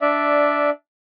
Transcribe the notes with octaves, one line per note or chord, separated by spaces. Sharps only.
D4 D5 E5